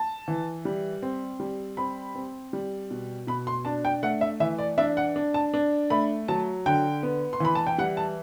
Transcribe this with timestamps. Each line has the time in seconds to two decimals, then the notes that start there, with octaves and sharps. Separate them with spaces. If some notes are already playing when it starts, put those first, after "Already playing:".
Already playing: A5
0.28 E3
0.65 G3
1.02 C4
1.40 G3
1.77 C4 B5
2.15 C4
2.53 G3
2.91 B2
3.27 B2 B5
3.47 C6
3.65 D4 A5
3.85 G5
4.03 A3 F#5
4.21 E5
4.40 E3 E5
4.59 D5
4.78 D4 E5
4.97 F#5
5.16 D4
5.34 A5
5.54 D4
5.90 A3 B5
6.28 F#3 A5
6.66 D3 G5
7.03 B3
7.33 C6
7.40 E3 B5
7.55 A5
7.67 G5
7.78 G3 F#5
7.97 A5